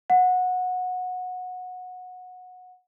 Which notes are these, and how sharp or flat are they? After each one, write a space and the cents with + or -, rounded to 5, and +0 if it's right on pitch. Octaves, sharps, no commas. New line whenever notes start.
F#5 -20